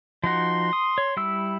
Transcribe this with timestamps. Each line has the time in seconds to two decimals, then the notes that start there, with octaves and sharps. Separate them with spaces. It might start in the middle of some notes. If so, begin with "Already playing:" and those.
0.24 F3 D#4 F#4 C6
0.73 D#6
0.98 C#5
1.17 G3 E4 E6